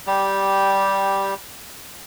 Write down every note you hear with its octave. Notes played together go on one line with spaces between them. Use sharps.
G3 G4